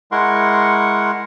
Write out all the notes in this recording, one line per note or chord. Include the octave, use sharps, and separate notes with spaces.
G#3 E4 A#4 F#5 C6 C#6